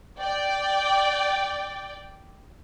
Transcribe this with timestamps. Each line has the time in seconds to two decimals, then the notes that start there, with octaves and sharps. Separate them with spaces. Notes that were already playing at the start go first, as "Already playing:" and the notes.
0.20 D5 G5